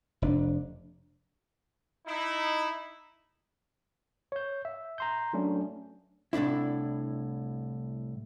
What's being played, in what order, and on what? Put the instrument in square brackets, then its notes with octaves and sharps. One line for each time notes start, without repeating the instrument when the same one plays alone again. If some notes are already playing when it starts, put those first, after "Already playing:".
[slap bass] F1 D4
[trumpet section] D#4 E4
[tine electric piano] C#5 G6
E5
A#5 C6 G6
F#3 A3 C#4 D4
[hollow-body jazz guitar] C2 A2 C#3 D4 E4